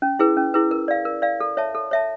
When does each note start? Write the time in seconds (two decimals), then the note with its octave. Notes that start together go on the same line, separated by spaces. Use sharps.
0.02 C#4
0.19 E4 G#4 B4
0.37 C#4
0.54 E4 G#4 B4
0.71 A#4
0.88 D5 F5
1.05 A#4
1.22 D5 F5
1.40 A4
1.57 C#5 E5 A5
1.75 A4
1.91 C#5 E5 A5